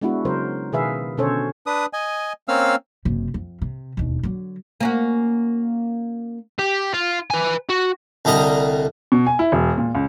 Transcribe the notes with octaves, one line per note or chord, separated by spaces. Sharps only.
G#3 B3 D4 E4 F#4
C#3 F#3 A#4 C5
B2 D#3 G#4 B4 E5 F5
B2 D3 C#4 A4 C5 C#5
D4 B4 D#6
D#5 G#5
A#3 C4 C#4 F5 E6 F6
F#1 C3
F2
C3
E1 D#2
D3 F#3
A#3 C#4 F#4
G4
F4
B4 G#5
F#4
C2 D3 G3 D#5 A#5
B2
G#5
E4
E1
A#2
C#2